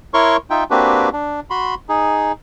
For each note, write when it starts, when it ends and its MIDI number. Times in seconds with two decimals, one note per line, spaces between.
0.14 0.37 64
0.14 0.37 70
0.14 0.37 73
0.14 0.37 84
0.14 0.37 85
0.50 0.64 63
0.50 0.64 65
0.50 0.64 76
0.50 0.64 79
0.70 1.09 58
0.70 1.09 60
0.70 1.09 62
0.70 1.09 66
0.70 1.09 67
0.70 1.09 71
1.13 1.40 62
1.50 1.75 66
1.50 1.75 83
1.50 1.75 84
1.89 2.32 63
1.89 2.32 68